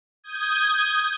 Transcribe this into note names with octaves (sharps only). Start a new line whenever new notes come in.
D#6 G6 G#6